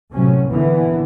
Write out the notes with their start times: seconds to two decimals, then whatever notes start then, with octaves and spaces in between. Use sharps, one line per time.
0.12 A2 C3 F#3 C#4
0.49 A#2 D3 E3 B3